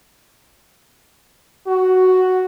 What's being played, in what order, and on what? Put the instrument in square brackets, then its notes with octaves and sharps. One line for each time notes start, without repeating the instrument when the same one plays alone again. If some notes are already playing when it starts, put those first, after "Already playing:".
[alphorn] F#4